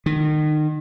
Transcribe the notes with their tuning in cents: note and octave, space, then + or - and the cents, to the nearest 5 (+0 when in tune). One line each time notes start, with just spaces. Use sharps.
D#3 -30